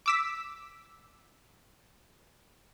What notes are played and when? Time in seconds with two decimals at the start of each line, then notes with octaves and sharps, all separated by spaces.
0.06 D6 E6 B6